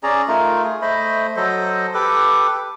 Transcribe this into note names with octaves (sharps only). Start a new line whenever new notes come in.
C#4 G#4 D5 A#5
A3 D#4 F4 A#4
G#4
A3 C5 D#5 B5
F#3 A4 C5 D#5
G4 A4 B4 D6